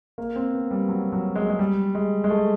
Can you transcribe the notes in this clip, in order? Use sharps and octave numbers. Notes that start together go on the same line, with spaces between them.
A#3
C4
B3
G3
F#3
F#3
G#3
G#3
G3
G#3
G#3
A3